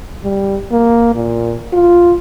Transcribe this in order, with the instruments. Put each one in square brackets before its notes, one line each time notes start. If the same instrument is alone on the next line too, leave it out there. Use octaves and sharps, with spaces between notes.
[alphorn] G3
A#3
A#2
F4